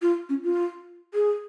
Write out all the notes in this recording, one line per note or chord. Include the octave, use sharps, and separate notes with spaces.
F4
C#4
F4
G#4